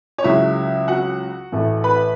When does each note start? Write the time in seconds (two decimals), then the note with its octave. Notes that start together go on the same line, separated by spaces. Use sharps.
0.18 C#5
0.24 C#2 C#3 F#3 E4 E5
0.88 F#4 F#5
1.52 A1 A2 E3 A3
1.84 B4 B5